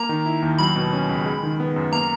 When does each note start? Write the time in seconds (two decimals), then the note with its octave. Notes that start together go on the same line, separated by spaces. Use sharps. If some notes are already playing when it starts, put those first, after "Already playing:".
Already playing: A#3 A#5
0.09 D#3
0.26 E4
0.42 D#2
0.59 F#3 B5
0.76 B2
0.93 C#4
1.09 C#2
1.26 G#3
1.43 D#3
1.60 B3
1.76 F#2
1.92 A#3 A#5